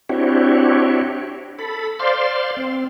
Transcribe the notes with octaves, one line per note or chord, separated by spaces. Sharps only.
C4 D4 E4 F#4 G4 C#5
A4 B5
C5 D5 F5 C6
C4